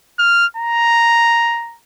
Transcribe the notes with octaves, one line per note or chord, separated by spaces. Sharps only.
F6
A#5